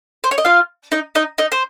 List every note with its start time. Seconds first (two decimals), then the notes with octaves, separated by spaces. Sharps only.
0.24 C5
0.31 C#5
0.38 D#5
0.45 F4 F5
0.92 D#4 D#5
1.15 D#4 D#5
1.38 D#4 D#5
1.52 C5